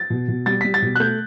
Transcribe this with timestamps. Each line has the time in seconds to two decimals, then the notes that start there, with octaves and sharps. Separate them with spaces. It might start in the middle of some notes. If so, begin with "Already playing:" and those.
Already playing: A6
0.10 B2
0.28 B2
0.46 G3 A6
0.61 G3 B6
0.74 A6
0.82 B2
0.95 F#6
1.00 A3 G6